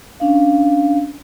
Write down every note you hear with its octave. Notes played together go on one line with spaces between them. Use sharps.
C#4 D4 F5